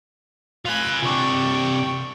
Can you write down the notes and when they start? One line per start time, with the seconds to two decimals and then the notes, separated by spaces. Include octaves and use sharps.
0.65 F4 G#5 B5 F#6
1.02 C3 D4 G5 C#6